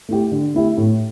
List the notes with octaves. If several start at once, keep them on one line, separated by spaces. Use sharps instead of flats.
A3 E4 G4
D3
A3 E4 G4
A2